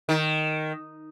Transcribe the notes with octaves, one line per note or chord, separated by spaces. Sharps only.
D#3